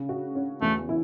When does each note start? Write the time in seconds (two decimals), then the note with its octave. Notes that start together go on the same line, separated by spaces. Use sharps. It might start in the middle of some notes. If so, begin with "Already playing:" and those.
Already playing: C#3
0.09 F#4
0.35 C#4
0.62 E2 A3
0.89 E4